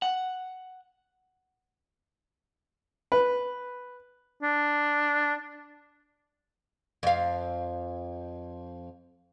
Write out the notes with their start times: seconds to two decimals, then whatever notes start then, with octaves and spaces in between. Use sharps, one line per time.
0.02 F#5
3.12 B4
4.42 D4
7.03 F2 F5